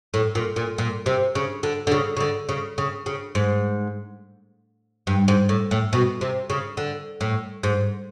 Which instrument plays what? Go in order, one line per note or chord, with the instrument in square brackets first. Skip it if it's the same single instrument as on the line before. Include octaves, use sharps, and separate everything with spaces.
[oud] A2
A#2
A#2
A#2
C3
C#3
D3
D3
C#3
C#3
D3
C#3
C#3
C#3
G#2
G2
G#2
A2
A2
B2
C3
C#3
D3
A2
G#2